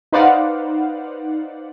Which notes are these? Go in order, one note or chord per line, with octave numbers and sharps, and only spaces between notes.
D#4 B4 C5 D5 F5 F#5